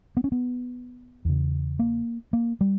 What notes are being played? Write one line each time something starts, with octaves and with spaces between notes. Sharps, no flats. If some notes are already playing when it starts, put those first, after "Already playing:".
B3
C#4
B3
E2 C#3
A#3
A#3
G3